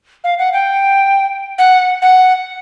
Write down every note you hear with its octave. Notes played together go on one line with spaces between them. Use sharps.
F5
F#5
G5
F#5
F#5